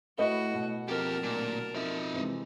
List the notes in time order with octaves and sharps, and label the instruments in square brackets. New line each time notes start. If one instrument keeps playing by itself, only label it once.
[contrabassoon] A2 [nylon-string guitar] E4 B4 D#5 [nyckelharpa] F#4
[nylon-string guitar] B2
[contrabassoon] F2 [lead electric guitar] A#3 G4 [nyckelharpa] A#4 A5
[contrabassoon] D1 [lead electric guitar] A#2
[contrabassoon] F2 [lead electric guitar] D#4 E5
[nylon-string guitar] C3 E3 G#3